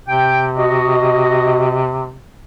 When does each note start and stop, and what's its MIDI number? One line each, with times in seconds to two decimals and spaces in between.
0.08 2.18 48
0.08 0.45 79
0.57 1.80 66
0.57 1.80 75